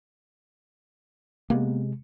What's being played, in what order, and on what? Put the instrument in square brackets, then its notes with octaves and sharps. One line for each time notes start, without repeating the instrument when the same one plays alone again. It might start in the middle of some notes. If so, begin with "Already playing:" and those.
[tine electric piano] C3 G#3 [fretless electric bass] A#3 B3